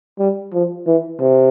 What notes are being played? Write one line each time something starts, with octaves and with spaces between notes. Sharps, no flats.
G3
F3
E3
C3